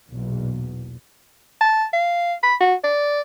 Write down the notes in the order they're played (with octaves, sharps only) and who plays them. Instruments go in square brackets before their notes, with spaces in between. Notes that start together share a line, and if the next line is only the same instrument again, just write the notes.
[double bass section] B1 E2 A#2 F#3
[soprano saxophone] A5
F5
B5
F#4
D5